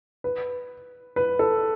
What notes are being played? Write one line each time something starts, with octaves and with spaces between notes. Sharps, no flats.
B4
B4
A4